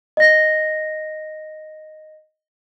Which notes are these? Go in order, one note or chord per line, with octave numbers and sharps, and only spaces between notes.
D#5 A#6